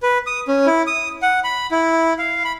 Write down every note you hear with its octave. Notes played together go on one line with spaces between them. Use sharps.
B4
D#6
C#4
E4
D#6
F#5
B5
E4
F5
B5